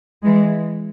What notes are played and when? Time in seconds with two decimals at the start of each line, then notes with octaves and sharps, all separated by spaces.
0.24 E3 G#3